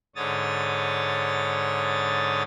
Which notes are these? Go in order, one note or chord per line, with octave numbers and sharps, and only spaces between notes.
G#2 D3 C#5 D#6 A6